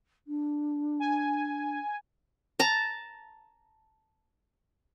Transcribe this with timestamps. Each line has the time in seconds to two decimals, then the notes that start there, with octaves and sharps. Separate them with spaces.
0.27 D4
1.00 G#5
2.59 A5 A#5